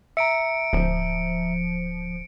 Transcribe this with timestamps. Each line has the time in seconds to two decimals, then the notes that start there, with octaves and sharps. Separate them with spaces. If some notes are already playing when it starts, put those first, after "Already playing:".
0.17 E5 A#5 C#7 D7
0.73 D1 F3